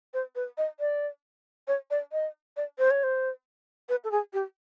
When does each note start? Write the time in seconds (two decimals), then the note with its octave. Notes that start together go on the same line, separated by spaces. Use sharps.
0.14 C5
0.35 B4
0.58 D#5
0.80 D5
1.68 C#5
1.91 D5
2.12 D#5
2.57 D5
2.78 C5
2.91 C#5
3.03 C5
3.89 B4
4.04 A4
4.11 G#4
4.33 G4